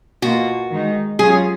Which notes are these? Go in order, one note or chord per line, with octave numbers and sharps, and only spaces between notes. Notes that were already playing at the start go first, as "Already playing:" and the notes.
B2 A#3 F4 F#4
D#3 G#3 D#4
F#3 C#4 F4 G#4